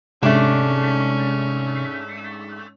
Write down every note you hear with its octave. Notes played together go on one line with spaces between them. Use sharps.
G#2 C3 A3 C#4 D4